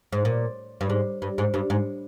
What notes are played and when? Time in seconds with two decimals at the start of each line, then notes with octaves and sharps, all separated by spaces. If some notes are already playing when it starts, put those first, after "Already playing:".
0.12 G#2
0.25 A#2
0.81 G2
0.90 G#2
1.22 G2
1.38 G#2
1.54 G2
1.70 G#2